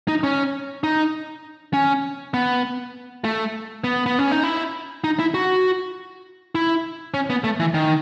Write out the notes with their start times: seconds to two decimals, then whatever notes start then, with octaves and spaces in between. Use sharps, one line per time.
0.08 D#4
0.24 C#4
0.84 D#4
1.74 C#4
2.34 B3
3.24 A3
3.84 B3
4.06 B3
4.19 C#4
4.31 D#4
4.43 E4
5.04 D#4
5.19 E4
5.34 F#4
6.55 E4
7.14 C#4
7.30 B3
7.44 A3
7.60 E3
7.74 D#3